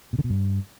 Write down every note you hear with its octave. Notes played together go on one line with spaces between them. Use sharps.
B2
D3
B2
G2